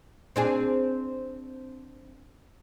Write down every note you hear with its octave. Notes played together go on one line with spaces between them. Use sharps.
C4 D4 G#4